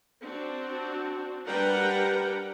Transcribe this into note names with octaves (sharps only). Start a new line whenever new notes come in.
C4 D4 F#4
G3 D4 A#4 B4 F#5 G5